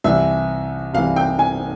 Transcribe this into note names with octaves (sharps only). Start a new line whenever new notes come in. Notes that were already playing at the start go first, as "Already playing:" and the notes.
C2 C3 E3 E5
C2 C3 E3 F5
G5
G#5